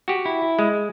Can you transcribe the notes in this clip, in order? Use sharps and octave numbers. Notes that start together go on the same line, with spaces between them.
F#4 G4
E4
G#3